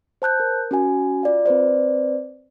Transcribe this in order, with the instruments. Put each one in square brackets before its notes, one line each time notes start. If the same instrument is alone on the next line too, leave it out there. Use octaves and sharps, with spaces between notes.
[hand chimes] C5 A5 F#6 G6
A#4
C#4 F#4 G#5
F4 D5 F5
C4 B4 C5 D5